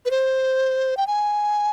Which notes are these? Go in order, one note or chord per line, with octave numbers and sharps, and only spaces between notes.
B4
C5
G5
G#5